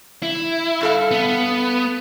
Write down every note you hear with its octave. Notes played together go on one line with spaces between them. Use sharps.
E4
G2 A4 F5
B3